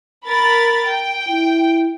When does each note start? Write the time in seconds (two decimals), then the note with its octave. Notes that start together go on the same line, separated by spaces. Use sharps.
0.25 A#4 B5 A6
0.87 G5
1.29 E4